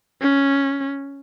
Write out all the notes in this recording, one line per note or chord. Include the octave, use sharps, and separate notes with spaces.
C#4